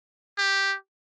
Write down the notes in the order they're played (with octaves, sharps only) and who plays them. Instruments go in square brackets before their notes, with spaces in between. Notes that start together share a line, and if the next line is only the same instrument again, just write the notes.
[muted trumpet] G4